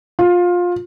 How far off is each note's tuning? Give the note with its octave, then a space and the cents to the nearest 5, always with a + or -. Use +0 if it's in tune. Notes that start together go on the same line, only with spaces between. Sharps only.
F4 +20